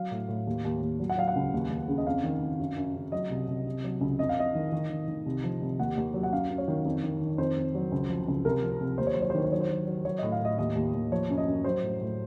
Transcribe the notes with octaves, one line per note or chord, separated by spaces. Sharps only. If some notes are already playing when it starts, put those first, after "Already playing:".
Already playing: F#3 F5
A2
A2
D#2
D#2
D#2
F#3
F#5
F#3 F5
F#5
C#2
D#2
D#2
C#3
D#5
F2 F5
D#3
F2
F#2
F#2
C#3
F#3 D#5
C2
C2
C3
F#3
C#2
F2 D#5
F5
F2 D#5
D#3
D#3
D#3
D#3
C2
F3
C2
D#2 F#5
D#2
F#3
F#5
F#2 F5
F#2
C#5
D#3
F2
D#3
D#3
F2 C5
F2
F#3
C#2
F3
C#2
C2 A#4
F3
C2
D#2 C5
C#5
F#3 C5
C#5
C5
D#3 C#5
C5
F#3 C#5
C5
F#3
F#3
F#3 C#5
A2 D#5
F5
A2 D#5
D#2 D#5
D#2
D#2
F3 C#5
F#2
D#5
F#2
F#3 C5
A2
A2